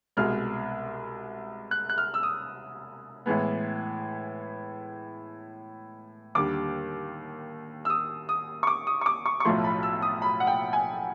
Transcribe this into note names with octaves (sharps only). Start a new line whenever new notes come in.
C2 B2 G#3 F6
F#6
F#6
F6
E6
D#6
A2 E3 G#3 B3
D#2 D3 G3 D6
E6
D#6
D#6
C#6
D6
D#6
C#6
D6
C#6
C#6
B1 A2 F3 A3 C6
B5
E6
D#6
B5
F#5
G5
G#5